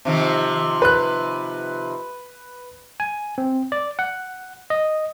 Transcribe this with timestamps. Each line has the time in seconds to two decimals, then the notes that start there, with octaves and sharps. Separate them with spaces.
0.05 C3 D#3 F3
0.82 B4 F#6
3.00 G#5
3.38 C4
3.72 D5
3.99 F#5
4.70 D#5